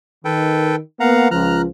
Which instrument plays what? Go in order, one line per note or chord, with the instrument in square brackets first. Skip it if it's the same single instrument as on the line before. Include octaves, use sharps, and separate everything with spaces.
[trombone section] D#3 [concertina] A4 B4 G5
[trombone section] A#3 B3 [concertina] F5 F#5 A#5
[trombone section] C#2 F3 [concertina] A#5 F6 F#6